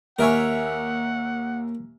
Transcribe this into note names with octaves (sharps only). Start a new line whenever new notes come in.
D#2 A#3 A#4 C#5 E5 F#5 G#5